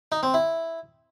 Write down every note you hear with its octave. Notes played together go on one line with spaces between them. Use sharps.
D#4
C4
E4